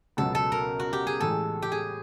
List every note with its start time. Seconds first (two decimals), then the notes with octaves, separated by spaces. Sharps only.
0.17 C#2 B2 F#3 B3 A4
0.35 A4
0.52 A#4
0.80 F#4
0.93 G4
1.07 G#4
1.20 A2 E3 G#3 A4
1.62 G4
1.72 G#4